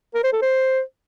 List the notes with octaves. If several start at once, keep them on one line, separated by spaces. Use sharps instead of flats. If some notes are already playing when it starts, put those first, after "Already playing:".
A#4
C5
A4
C5